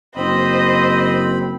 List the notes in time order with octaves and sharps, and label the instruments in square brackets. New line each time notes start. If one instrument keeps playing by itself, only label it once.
[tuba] F#1 [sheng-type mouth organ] C4 B5 [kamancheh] C5 D#5